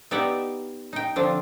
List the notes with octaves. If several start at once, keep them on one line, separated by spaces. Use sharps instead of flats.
B3 D#4 G4 D5 E5 F#5
D#4 G5
D3 F3 C4 D4